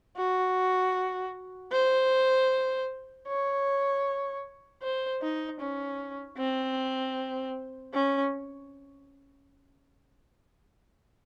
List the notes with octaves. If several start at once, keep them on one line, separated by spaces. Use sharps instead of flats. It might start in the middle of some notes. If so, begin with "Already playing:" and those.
F#4
C5
C#5
C5
D#4
C#4
C4
C#4